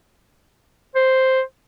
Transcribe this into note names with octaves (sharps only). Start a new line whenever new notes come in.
C5